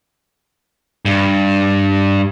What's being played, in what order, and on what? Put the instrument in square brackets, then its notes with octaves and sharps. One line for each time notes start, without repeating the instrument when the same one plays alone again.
[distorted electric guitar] G2